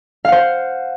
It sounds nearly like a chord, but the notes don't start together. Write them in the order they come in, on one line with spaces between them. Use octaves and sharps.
F5 F#5 C5